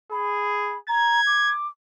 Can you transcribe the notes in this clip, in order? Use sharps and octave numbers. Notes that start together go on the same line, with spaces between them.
G#4 B5
A#5 G#6
D6